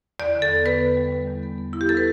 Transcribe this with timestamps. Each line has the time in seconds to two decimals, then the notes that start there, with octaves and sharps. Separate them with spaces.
0.20 E2 D5
0.35 D3
0.42 A4
0.50 B3
0.66 B3 B4
0.81 E2
0.97 G3
1.12 G3
1.27 E2
1.43 B3
1.58 B3
1.73 B3 E4
1.81 G4
1.89 D3 A4
1.97 B4